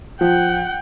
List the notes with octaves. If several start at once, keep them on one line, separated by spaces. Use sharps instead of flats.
F3 F#5 G5